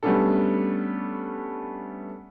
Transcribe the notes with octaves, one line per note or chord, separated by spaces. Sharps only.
G3 A3 B3 C#4 D4 A4